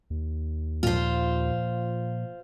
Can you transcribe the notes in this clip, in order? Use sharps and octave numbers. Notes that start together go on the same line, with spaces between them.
D#2
A#2 F3 F4 C5